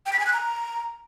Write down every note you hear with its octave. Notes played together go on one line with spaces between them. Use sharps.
G5
B6
G#5
F#6
A#5